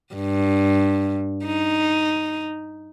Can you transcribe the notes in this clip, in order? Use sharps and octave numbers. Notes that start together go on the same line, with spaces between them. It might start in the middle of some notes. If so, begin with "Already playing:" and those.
G2
D#4